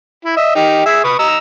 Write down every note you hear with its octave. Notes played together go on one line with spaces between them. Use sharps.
E4
D#5 E5
D#4 G4
G#4 E5
B4 C#6 D#6
D#5 A#5 E6